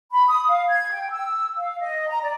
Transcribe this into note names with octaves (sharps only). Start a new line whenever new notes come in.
B5
D#6
F5
G#6
G5
E6
F5
D#5
A#5
D5